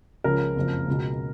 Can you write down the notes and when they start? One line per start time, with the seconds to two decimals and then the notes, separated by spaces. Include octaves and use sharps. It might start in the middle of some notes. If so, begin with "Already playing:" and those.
0.24 C#2 C#3 F3 A#4
0.56 F#1 F2 F3
0.88 C#2 B2